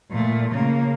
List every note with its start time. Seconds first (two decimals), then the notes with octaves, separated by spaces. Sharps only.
0.11 A#2 A3
0.51 C#3 A#3